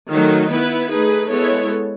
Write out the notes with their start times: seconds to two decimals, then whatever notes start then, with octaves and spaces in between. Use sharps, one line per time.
0.09 D#3 F#3 A3 D#4
0.49 B3 E4 B4
0.90 A3 D#4 G#4 B4
1.29 G#3 B3 E4 A4 C#5